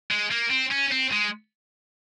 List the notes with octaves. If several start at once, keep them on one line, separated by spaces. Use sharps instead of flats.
G#3
A#3
C4
C#4
C4
G#3